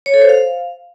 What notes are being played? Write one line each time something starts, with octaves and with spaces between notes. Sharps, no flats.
C#5
A4
C5
F5